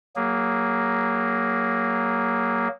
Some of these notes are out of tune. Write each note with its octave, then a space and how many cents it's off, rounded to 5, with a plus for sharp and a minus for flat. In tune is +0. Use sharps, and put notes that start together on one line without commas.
F#3 +15 A#3 +0 G#4 -15